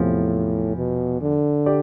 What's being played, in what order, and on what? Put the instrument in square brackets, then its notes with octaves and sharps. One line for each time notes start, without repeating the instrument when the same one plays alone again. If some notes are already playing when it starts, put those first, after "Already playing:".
Already playing: [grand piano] E2 C3 F3 [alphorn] A2
[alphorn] B2
D3
[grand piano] G4 D5